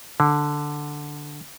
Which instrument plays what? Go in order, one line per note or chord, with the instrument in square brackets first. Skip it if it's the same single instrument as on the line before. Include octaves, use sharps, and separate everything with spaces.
[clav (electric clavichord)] D3